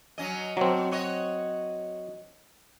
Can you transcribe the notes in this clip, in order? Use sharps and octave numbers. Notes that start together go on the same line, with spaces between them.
F#3 C#4 D#5
B2 F#3 C4
F#4 C#5 D#5